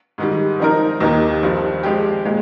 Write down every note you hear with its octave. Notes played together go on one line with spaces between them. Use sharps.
G#2 D#3 G3
F3 C4 D#4 A#4
D#2 D#3 A#3 D#4 G4
G2 F3 C4
F3 G#3 C4 G4
A#2 G#3